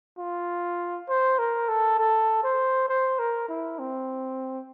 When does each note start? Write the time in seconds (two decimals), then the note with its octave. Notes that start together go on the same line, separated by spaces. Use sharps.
0.18 F4
1.09 C5
1.39 A#4
1.69 A4
1.98 A4
2.44 C5
2.89 C5
3.19 A#4
3.49 E4
3.79 C4